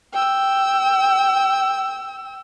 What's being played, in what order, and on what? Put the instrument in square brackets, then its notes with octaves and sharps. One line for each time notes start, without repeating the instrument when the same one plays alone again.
[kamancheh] G5 E6